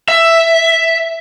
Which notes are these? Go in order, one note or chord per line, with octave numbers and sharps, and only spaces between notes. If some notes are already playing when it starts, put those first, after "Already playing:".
E5